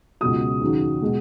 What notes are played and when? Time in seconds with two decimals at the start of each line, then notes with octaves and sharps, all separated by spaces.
0.21 C#2 B2 F#3 D#6
0.61 D#2 C#3 F#3
1.02 B2 G#3